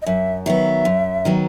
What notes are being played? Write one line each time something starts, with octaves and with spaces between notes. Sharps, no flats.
D#5
F#2 E5
D#3 F#3 B3 E5
F#2
D#3 F#3 B3